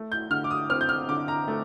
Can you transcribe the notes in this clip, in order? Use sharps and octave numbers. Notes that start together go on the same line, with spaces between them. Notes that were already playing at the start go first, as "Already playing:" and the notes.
Already playing: A3
G6
D3 F6
D6
D#6
C4 F6
G6
F6
D3 D6
A#5
A3